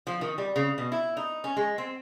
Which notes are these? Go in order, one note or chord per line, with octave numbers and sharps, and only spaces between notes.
F3
D#3
G3
C#3
B2
E4
D#4
C#4
G#3
C4